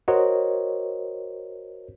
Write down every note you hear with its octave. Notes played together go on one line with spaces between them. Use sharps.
F#4 A#4 C5 C#5 D#5